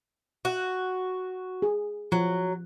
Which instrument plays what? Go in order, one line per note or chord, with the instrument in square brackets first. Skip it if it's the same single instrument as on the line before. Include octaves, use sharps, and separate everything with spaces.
[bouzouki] F#4
[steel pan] G#4
[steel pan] F3 [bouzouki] F#3